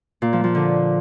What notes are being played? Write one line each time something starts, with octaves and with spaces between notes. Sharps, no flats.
A#2
F3
F3
D3